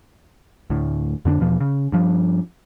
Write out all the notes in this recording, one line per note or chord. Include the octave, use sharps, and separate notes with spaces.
D2 A2
F2 D3 C4 D4
E2 B2 F3
C#3
G2 F3